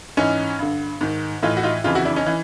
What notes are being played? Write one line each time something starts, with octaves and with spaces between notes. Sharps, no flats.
G#2 E3 C#4 D#4
G2 D3
G#2 D#3
A2 E3 D#4 F4
F#4
D#4 F4
F2 C#3 E3 D#4 F4
E4 F#4
D4 E4
C#4 D#4
E3